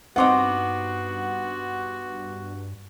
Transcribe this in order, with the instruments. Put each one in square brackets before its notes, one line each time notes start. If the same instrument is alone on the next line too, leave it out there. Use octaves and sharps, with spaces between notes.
[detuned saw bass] G2 [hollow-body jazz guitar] B3 C4 D#4 [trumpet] F#4 [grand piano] F#5 C6 D6